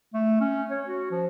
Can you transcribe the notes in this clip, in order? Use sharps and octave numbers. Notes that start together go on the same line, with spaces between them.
A3
C#4
C#5
F#4
F3